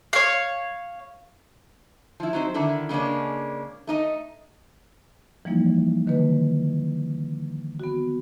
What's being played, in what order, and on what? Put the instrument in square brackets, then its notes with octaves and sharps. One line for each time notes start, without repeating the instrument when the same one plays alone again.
[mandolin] C#5 F5
[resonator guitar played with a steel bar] F3 E4
F#3 C4 D#4 C5
D3 D#3 D4 E4 A4
C#3 G#3 A#3 C#4 D4
A3 D#4 D#5
[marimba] E3 F3 G3 A#3 D#4 E4
D3 D#3 A#3 B4
B3 F#4